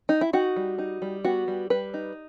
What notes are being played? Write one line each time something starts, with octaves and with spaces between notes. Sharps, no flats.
D#4
E4
D#4 F#4
G3
D#4
G3
B3 F#4
G3
G3 B4
D#4